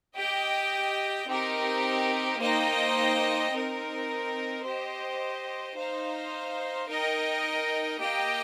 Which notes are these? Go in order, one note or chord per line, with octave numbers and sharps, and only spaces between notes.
G4 D#5 G5
C4 D#4 G4 A#4
A#3 D#4 C5 D#5 G5
C4 D#4 A#4
G4 C5 D#5
D#4 C5 F5
D#4 A#4 D#5 G5
A#3 G4 D#5 G5